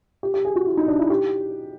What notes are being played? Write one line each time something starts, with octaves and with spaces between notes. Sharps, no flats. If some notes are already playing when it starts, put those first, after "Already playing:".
G4
G4
G#4
F#4
E4
D#4
D4
E4
G4